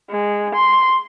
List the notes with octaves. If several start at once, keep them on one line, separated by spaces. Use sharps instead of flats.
G#3
C6